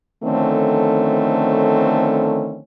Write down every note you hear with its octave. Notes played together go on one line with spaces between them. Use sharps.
D3 D#3 F3 A3 C4 C#4